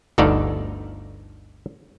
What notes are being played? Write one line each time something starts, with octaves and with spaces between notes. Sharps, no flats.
G1 D2 D#4 A4 D5 F5